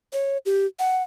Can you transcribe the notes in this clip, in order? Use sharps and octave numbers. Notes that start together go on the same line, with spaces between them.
C#5
G4
F#5